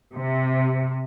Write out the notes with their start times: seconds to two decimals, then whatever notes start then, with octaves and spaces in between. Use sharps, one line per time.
0.15 C3